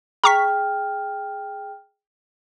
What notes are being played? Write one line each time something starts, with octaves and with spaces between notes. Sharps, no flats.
G#4 G5 A#5 C#6 F6 B6